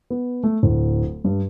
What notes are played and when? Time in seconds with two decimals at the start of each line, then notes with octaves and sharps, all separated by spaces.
0.10 B3
0.43 A3
0.63 D1
1.24 G2